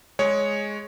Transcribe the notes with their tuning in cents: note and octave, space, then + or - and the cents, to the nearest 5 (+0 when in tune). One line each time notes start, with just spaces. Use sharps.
G#3 +0 G#4 +0 C#5 +0